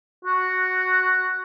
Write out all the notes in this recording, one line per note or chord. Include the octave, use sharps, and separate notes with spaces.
F#4